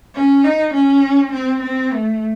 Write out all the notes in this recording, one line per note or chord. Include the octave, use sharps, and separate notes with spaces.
C#4
D#4
C#4
C4
C4
A3